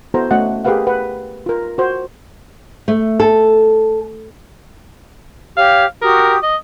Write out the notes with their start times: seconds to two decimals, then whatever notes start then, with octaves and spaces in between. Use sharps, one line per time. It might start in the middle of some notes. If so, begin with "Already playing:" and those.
0.14 B3 E4 F#4 A4 C5 A#5
0.31 A3 C#4 F#4 D#5 F#5
0.65 G4 G#4 A#4 B4 F5 F#5
0.87 B4 F#5
1.46 F4 A#4
1.78 F#4 C5
2.88 A3
3.20 A4
5.57 G4 C#5 F5
6.02 F#4 G4 A#4 D#6
6.43 D#5